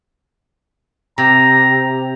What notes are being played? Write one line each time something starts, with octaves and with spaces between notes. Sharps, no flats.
C3 A#5